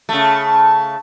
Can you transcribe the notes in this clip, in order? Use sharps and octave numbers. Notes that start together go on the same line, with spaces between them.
C#3 A3